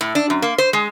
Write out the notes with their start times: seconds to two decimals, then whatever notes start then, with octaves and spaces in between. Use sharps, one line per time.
0.01 A2
0.15 D4
0.30 F#2
0.42 A#3
0.58 C5
0.73 G#3